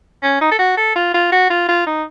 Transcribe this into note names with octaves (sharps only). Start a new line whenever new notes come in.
C#4
D#4
A4
F#4
A4
F4
F4
F#4
F4
F4
D#4